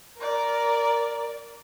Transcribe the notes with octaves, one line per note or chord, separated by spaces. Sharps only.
A#4 D5